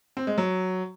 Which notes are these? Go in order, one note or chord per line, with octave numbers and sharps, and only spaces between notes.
C4
G#3
F#3